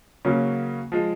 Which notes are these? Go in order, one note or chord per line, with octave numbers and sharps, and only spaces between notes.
C#3 F#3 A#3 C#4
F3 G#3